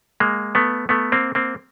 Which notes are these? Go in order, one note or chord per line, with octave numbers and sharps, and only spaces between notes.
G#3 A#3
A3 B3
A3 B3
A#3 C4
A#3 C4